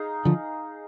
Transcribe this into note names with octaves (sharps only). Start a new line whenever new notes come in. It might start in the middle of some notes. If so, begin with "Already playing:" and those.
Already playing: D#4 G#4 F5
D3 F3